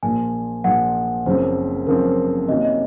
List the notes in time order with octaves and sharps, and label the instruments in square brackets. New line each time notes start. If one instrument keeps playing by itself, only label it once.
[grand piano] A#1 A#2 F3 A#3 [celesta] G#5
[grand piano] A#1 A#2 F3 A#3 [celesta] F#5
[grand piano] F#1 F#2 F3 C4 [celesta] C5
[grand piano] F#1 F#2 F3 C4 [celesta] A#4
[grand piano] C3 D#3 A#3 C#4 F#4 [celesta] D#5
[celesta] D#5